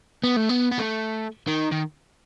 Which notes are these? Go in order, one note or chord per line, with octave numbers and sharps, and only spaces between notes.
B3
A3
B3
B3
A3
D#3
D#3